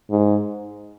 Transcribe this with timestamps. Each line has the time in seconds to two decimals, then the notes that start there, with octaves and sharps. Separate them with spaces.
0.10 G#2